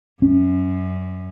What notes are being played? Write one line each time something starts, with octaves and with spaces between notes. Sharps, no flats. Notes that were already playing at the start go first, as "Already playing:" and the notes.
F#2 C#4